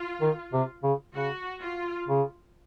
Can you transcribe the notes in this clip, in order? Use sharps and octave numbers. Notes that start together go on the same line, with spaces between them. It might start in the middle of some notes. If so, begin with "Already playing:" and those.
Already playing: F4
D#3
C3
C#3
C#3 F#4
F4
C#3